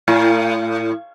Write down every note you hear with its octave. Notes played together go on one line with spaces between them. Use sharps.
A2